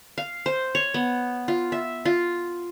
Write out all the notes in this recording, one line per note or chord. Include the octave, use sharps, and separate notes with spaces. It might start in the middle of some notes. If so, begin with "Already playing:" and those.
F5
C5
C#5
B3
F4
E5
F4